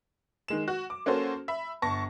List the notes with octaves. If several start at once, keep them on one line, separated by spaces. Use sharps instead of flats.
D#3 G#3 E7
F#4
D6
A#3 C#4 F#4 A4 C5
E5 B5
G1 A5 C#6 A#6